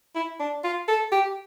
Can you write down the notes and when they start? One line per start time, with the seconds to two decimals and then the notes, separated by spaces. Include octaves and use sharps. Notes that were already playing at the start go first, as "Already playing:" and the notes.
0.15 E4
0.40 D4
0.64 F4
0.88 A4
1.12 G4